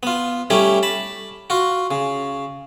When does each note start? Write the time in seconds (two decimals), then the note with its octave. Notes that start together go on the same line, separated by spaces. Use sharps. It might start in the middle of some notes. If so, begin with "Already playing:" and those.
0.03 B3 F4
0.50 G3 A3 C#4 E4 G4
0.83 A5 B5
1.50 F4 F#4
1.91 C#3